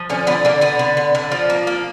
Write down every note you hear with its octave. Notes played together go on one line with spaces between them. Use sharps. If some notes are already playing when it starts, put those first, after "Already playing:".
Already playing: F3
D3 C#4
D3 B3
D3 A#3
D3 B3
D3
D3
D3
F3
A#3
A#3